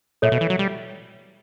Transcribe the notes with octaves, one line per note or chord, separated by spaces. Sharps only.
A#2 A4 C#5 E5
B2
E3
F#3
G3